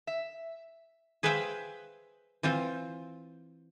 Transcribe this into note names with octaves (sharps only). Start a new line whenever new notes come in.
E5
G#4 B4 C5 E5 F5 G5
E3 C4 F4 C5